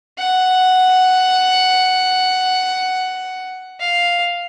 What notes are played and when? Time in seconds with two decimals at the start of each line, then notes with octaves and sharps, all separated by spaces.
0.18 F#5
3.80 F5